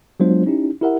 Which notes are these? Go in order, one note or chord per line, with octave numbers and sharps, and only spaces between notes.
F#3 G#3 B3 D4 F4 C5
C#4 D#4 E4 G4
E4 G4 A#4 E5 F#5